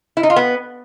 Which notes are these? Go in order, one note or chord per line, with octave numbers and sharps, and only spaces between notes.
E4
D#4
F4
B3